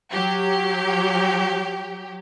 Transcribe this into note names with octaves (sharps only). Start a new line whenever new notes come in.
F#3 G4